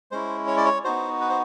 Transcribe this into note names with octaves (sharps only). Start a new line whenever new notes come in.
G#3 C#4 E4 C5
C#5
D5
C#5
B3 D#4 F#4 C5
B4
C5